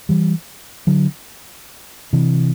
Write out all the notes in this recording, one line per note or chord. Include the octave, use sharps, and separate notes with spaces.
E3 G3
D3 F#3
C3 E3